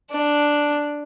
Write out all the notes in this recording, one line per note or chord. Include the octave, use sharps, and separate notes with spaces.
D4